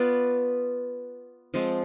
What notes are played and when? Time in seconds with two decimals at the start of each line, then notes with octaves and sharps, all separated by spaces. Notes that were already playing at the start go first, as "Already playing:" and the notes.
Already playing: B3 F4 B4 D5
1.54 F3 G#3 C4